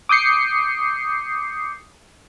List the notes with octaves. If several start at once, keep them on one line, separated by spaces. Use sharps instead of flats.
D6 D#6 G6 C7 C#7